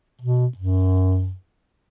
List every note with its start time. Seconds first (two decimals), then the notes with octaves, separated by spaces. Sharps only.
0.22 B2
0.58 F#2